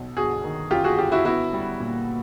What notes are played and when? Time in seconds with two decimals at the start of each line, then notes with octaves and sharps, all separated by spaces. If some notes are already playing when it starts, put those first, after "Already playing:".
Already playing: B1
0.17 G1 F#4 G#4
0.44 D#3
0.71 F#2 F4 G4
0.84 F#4 G#4
0.98 G1 F4 G4
1.12 E4 F#4
1.25 B3 E4 F#4
1.53 G3
1.80 A#2